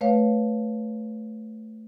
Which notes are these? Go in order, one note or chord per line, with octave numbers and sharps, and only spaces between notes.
A3 B4 C#5 F5